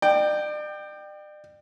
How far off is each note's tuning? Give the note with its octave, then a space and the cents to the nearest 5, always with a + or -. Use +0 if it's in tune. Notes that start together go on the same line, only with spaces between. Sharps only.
D5 +40 G5 +0